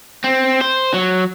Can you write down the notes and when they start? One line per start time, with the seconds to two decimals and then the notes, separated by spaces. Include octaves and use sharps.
0.24 C4
0.61 C5
0.94 F#3